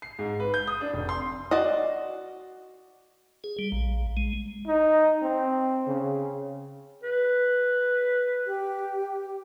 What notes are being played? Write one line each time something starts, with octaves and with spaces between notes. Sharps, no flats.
C7
G#2
B4
G6
D#6
D4
F1
C6
F#4 D5 D#5
G#4
G3
A#1
G#3
D#4
C4
C#3
B4
G4